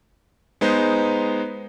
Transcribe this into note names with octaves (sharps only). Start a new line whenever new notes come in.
G#3 B3 D#4 C5